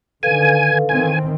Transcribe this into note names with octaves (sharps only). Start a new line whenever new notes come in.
D3 D#3 A4 B4 F5 G#5
D#3 E3 C4 G#5